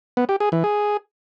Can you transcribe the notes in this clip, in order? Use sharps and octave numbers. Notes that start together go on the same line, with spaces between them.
B3
G4
G#4
E3
G#4